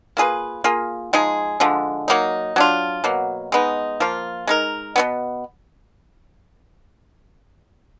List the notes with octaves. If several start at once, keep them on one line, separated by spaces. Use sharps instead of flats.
A#3 F4 G#4 B4
A#3 F4 G#4
F3 G#3 D#4 G#4
D3 F3 G#3
F#3 A#3 D#4
F#3 D4 F4
B2 F#3 A#3
G#3 B3 D#4
F3 A#3 F4
G#3 D#4 A#4
B2 F#3 B3